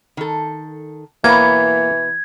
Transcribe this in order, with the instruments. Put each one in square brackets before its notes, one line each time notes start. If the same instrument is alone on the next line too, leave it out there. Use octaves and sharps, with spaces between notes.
[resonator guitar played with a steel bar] D#3 A4
[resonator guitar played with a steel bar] B2 B3 C#5 [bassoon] E3 [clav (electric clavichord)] A#3 [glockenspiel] G#6